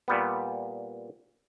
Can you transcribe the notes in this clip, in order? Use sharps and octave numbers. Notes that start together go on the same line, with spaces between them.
A#2 G3 B3